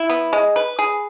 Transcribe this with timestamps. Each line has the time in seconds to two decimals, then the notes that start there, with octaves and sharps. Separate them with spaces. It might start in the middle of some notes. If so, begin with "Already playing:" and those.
Already playing: E4
0.10 B3
0.33 G#3
0.56 B4
0.79 G#4